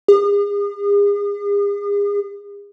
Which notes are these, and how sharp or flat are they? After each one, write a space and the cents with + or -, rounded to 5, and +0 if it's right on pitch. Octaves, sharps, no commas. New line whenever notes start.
G#4 -40